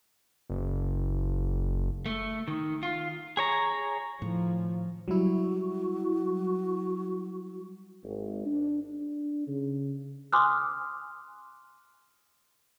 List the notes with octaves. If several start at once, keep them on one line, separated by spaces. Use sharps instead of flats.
F#1
A3
D#3
F4
G#4 C#5 A#5
A2 D#3 F3
F#3 G3 E4 F#4
G#1
D4
D4
C#3
G#5 C6 D6 D#6 F6 F#6